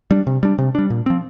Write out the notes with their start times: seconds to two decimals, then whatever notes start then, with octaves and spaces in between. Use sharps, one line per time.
0.11 G3 D4
0.27 C3
0.43 G3 D4
0.58 C3
0.75 G3 D4
0.90 A#2
1.06 F3 C4